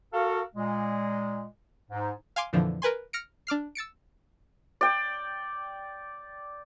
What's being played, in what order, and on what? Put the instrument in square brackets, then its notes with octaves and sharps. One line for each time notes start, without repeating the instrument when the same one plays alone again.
[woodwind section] F#4 A4 A#4 F5
A#2 G#3
G#2
[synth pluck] F5 G#5 C6 D6
F2 A#2 D3 E3 F3
A#4 B4 G#5 C6
F6 A#6 C#7 D7
D4 D6 F6 C7
E6 A6 C#7 D7
[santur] D5 G5